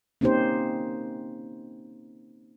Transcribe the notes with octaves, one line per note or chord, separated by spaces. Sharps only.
A#3 C4 C#4 D#4 G4 C5